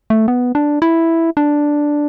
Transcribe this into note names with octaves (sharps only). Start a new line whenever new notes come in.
A3
B3
D4
E4
D4